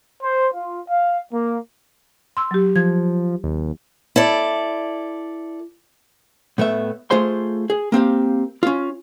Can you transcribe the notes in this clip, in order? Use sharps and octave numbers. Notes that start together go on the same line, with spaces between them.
C5
F4
F5
A#3
C6 E6
F#3 G4
F3 G#6
D#2
E4 A4 D5
A2 A3 B3 E5
A3 F4 G#4 C5 C6
G#4
A#3 C4 G4 F5
C#4 F4